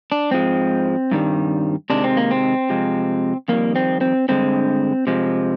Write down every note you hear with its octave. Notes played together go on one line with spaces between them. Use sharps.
D4
G#2 F3 G#3 C4
G2 D#3 G3
C3 D#3 G#3 D4
C4
A#3
C4
C3 F3 G#3
F2 D#3 G3 A#3
C4
C4
G2 D3 G#3 C4
C3 F3 G#3